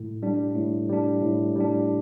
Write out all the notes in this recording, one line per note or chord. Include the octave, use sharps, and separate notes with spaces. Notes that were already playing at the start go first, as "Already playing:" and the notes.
Already playing: A2
G3 D4
A2
G3 D4
A2
G3 D4